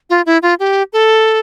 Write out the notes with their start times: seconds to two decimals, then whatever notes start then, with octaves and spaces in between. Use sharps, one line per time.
0.10 F4
0.26 E4
0.42 F4
0.60 G4
0.93 A4